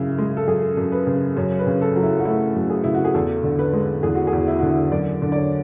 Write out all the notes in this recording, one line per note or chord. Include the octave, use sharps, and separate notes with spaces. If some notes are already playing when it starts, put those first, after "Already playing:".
Already playing: F#2 C#3 E4
G#3
A4
F#2 G#4
F#2
B4
C#3
F#2 C#5
B4
C#3
A4
F#3
E4
F#4
A3 E4
F#2
G#4
C#3 E4
F#4
G#4
E2 A4
D3
B4
G#3
E2 G#4
F#4
G#4
E2
E4
D3 F#4
E4
F#2 D5
D3
D5
C#5